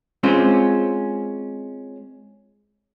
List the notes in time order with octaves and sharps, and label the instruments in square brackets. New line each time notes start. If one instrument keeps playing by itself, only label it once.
[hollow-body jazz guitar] G#3 C4 C#4 F4 C5